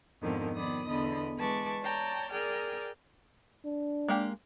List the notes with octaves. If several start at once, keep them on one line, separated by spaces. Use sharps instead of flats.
F2 G#2 B2 D3 D#3 F3
D#3 F3 B3 D5 B5 D#6
E2 D3 B3 D#5 B5
E3 G#3 B4 A5 C#6 D6
C#5 D5 G5 A5 A#5
G#4 A#4 D5 G5 F6
D4
G#3 A#3 G4